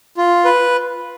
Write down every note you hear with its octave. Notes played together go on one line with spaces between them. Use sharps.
F4
B4